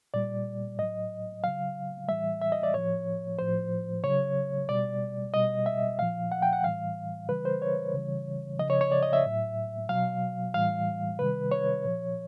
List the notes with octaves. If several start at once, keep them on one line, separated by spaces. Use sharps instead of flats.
A#2 G3 D5
A2 F#3 D#5
C#3 F#3 F5
A2 E3 G3 E5
E5
D#5
D5
A2 F3 C#5
A2 F3 C5
C#3 F#3 C#5
B2 G3 D5
B2 G3 D#5
E5
A#2 F3 F5
F#5
G5
F#5
A2 E3 G3 F5
C#3 E3 G3 B4
C5
C#5
C#3 E3 G3
C#3 F3 D#5
C#5
C#5
D5
D#5
E5
A2 F#3
B2 F#3 F5
A2 E3 G3 F5
C3 D#3 G3 B4
C#5
A#2 F3